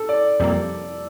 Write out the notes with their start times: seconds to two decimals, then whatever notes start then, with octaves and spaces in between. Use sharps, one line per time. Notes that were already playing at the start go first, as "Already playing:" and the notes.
Already playing: A4
0.09 D5
0.40 F2 C3 G3 A#3